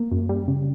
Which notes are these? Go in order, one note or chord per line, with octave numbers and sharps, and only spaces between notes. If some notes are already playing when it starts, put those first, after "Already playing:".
Already playing: A#3
F#2
G3
C#3